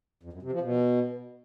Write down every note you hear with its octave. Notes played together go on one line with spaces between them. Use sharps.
F2
F#2
C3
F3
B2